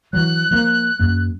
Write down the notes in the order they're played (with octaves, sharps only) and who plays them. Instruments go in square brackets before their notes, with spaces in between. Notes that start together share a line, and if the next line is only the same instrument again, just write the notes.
[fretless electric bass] E3 F#3 [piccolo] F#6
[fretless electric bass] F3 A#3
F#2 A#3